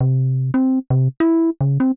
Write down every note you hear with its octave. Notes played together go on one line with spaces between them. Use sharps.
C3
C4
C3
E4
C#3
C4